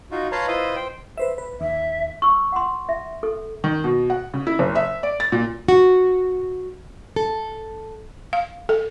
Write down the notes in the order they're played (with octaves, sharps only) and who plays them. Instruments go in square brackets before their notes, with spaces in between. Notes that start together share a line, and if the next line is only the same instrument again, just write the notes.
[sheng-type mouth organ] D#4 F4 F#4
B4 C#5 F5 A5 A#5 C6
E4 F4 B4 C5 D#5
C5 G5
[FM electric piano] B4 C5 E5
B4
[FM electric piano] D#2 [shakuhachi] E5
[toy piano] C#6 E6
F#5 C6
E5
A4
[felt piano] D#3
B2
F#5
C#3
E4
F#1
E5
D5
A6
A#2
[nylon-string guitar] F#4
A4
[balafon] F5
A4